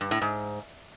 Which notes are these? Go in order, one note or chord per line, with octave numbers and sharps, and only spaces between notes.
G2
A2
G#2